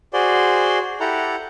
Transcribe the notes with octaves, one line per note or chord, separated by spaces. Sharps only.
F#4 G#4 C5 D5 C6
E4 G4 A4 F#5 A#5